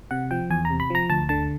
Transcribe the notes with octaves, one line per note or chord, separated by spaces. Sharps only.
C3 F#5
F3 G5
E2 G#5
A#5
C3
B5
F3 A#5
D2 A5
D3 A5